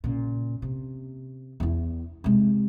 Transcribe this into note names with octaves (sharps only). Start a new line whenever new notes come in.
A#2 C#3
C3
E2 E4
C3 G#3